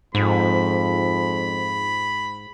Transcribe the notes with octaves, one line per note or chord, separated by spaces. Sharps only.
F2 G#2 B5